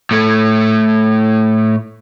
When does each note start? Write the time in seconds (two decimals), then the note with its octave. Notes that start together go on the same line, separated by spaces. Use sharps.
0.11 A2 A3